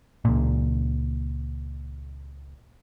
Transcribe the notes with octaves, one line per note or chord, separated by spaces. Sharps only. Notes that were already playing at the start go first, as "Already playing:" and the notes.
C#2 A#2